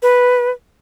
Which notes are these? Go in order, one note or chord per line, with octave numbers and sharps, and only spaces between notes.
B4